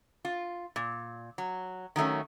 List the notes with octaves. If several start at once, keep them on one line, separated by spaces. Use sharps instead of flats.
F4
A#2
F#3
D#3 F#3 A3 C#4